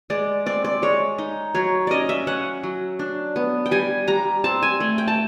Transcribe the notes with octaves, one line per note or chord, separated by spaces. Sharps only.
G#3 D5
C4 D5
D5
G#3 C#5
D#4
F#3 C#5
C#4 D5 D#5
E5
C#4 F#5
F#3
D4
B3
G5
G3 G#5
G3 A#5
C4 A5
G#5
A3
G5
A5